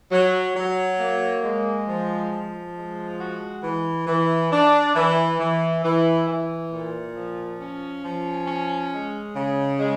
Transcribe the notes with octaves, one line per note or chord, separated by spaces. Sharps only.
F#3
F#3
A#3
G#3
F3
F3
G#3
F#4
E3
E3
D4
E3
E3
E3
E3
A#2
F3
C#4
F3
C#4
G#3
C#3
G#3